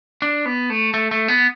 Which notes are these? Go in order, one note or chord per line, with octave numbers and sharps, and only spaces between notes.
D4
B3
A3
A3
A3
B3